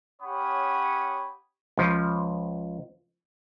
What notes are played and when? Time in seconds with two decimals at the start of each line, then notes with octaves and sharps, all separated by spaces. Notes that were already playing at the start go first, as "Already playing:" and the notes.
0.22 C#4 G4 C#5 F#5 B5 D#6
1.77 C#2 F3